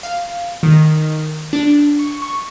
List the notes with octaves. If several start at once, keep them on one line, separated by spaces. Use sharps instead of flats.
F5
D#3
D4
C#6
C#6